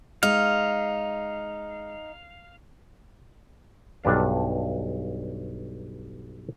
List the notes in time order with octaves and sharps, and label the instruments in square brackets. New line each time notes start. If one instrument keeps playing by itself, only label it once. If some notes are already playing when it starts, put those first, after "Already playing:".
[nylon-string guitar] G#3 [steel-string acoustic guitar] D#4 [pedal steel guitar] F5
[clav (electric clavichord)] B1 G2 D4 F5